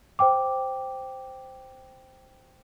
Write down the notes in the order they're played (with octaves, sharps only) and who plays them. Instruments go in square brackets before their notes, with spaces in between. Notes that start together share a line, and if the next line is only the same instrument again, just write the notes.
[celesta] C5 G5 D6